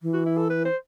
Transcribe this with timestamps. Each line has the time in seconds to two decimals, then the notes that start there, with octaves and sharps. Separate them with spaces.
0.02 E3
0.14 F#4
0.26 E4
0.38 A4
0.50 B4
0.65 C5